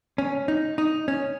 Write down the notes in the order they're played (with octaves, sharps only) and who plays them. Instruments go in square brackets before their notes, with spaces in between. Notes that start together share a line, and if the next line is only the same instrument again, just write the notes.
[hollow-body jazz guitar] C#4
D#4
D#4
C#4